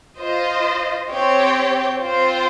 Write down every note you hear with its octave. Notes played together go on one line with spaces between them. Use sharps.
F4 C5 D#5
C4 G4 C#5 G5
C4 F4 C5